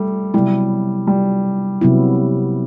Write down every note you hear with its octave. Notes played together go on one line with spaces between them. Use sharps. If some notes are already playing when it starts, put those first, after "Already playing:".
Already playing: G3 A3
C3 F#3 G3 B3 E4
G3
C3 F#3 B3 E4